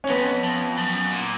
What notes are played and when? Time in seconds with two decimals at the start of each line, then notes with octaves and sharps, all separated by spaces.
0.04 C#4
0.09 F2 B3
0.44 F2
0.77 F#2
1.12 A#2